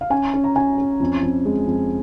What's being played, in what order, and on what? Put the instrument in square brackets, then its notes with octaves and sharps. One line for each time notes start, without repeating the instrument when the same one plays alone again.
[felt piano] F5
C#4 G#5
C#4
A#5
C#4 G#5
C#4
F2
F2
G#3
F2